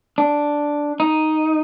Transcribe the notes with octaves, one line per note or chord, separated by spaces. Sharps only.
D4
D#4